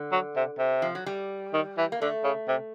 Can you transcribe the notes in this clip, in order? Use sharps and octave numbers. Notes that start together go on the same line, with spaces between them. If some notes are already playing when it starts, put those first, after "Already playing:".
Already playing: D3
F#3
C3
C3
F3
F#3
G3
D#3
E3
A#3
D3 A3
C#3
C3